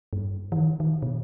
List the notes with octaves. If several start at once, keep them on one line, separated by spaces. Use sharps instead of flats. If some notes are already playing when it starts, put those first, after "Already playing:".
G2
E3
D#3
D#3
B2